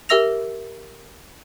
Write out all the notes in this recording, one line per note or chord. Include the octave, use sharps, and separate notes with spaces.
G4 A#4 E5 E6 A#6 F7